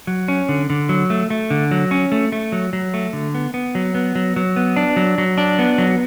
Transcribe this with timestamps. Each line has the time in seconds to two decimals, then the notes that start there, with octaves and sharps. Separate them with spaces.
0.07 F#3
0.28 C#4
0.49 D3
0.70 D3
0.89 F#3
1.10 A3
1.30 A3
1.50 D3
1.71 F#3
1.91 C#4
2.12 A3
2.32 A3
2.52 F#3
2.73 F#3
2.94 A3
3.13 D3
3.35 B3
3.54 B3
3.75 F#3
3.95 B3
4.15 F#3
4.36 F#3
4.56 B3
4.76 D4
4.96 F#3
5.18 F#3
5.38 D4
5.59 B3
5.78 F#3